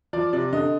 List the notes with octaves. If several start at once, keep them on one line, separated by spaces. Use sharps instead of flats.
F3 D5
C3 D5
D3 D#5